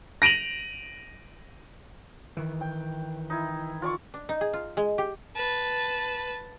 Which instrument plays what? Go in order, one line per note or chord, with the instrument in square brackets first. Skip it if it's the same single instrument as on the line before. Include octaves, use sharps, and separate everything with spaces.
[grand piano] A#6 D7 D#7 F7 F#7
[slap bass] D#3 E3
[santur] G5
D#4 E4
F4 D5 C#6
[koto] D4
D#4
G#4
F4
G#3
G4
[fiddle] B4 A5